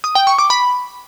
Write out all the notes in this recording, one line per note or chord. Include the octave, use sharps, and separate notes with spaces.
D#6
G5
C#6
D6
B5